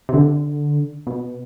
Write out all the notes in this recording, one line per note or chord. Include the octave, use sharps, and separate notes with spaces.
C3
D3
B2